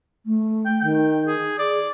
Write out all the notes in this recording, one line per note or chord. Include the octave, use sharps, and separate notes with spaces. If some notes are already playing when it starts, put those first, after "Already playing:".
A3
G5
D#3 G5
G#4
G#4 D5